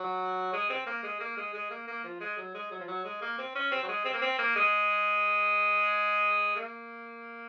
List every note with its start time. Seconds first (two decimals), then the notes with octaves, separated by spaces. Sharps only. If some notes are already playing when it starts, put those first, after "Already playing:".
Already playing: F#3
0.53 G#3
0.70 C4
0.86 A#3
1.03 G#3
1.20 A#3
1.37 G#3
1.54 G#3
1.70 A#3
1.87 A#3
2.04 F3
2.20 G#3
2.37 F#3
2.54 G#3
2.71 F#3
2.80 F3
2.88 F#3
3.05 G#3
3.21 A#3
3.38 C4
3.55 C#4
3.71 C4
3.83 F#3
3.88 G#3
4.05 C4
4.14 A#3
4.22 C4
4.39 A#3
4.56 G#3
6.57 A#3